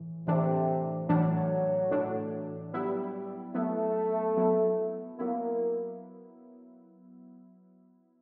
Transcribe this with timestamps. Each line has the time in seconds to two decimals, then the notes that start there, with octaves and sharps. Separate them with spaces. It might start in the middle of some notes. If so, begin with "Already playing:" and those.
Already playing: A2 E3
0.27 A2 C3 E3 A3 D4
1.08 A2 E3 F#3 A3 D4
1.91 A2 E3 A3 D4
2.73 F#3 G3 B3 E4
3.55 F#3 A3 B3 E4
4.37 F#3 B3 E4
5.18 F#3 A#3 B3 E4